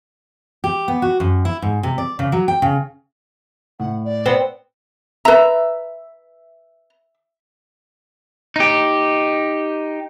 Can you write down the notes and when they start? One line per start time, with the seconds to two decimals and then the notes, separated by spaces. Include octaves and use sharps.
0.64 G4
0.88 B3
1.02 F#4
1.20 F#2
1.45 E4
1.62 G#2
1.83 C3
1.98 D5
2.19 C#3
2.32 F#3
2.48 G5
2.62 C#3
3.80 A2 F#5
4.05 D5
4.26 B3 C4
5.25 B4 E5 A#5
8.56 D#4 G4